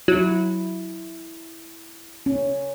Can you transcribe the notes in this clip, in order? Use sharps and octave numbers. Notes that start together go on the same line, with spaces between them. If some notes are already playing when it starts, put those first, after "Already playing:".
F#3 E4
C#4